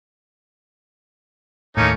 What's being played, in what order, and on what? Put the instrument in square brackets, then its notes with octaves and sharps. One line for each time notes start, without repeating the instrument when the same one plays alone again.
[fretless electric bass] D#2 A2 [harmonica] A3 C#4 [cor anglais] A#3 [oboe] D#4